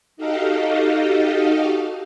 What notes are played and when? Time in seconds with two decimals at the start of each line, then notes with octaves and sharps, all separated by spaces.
0.17 D#4 F#4 G4 A4 D#5 F5